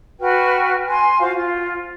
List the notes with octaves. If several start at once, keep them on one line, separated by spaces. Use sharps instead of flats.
F#4 B4 G5 F6
G#5 C6
F4 F#4 C5 F5
F4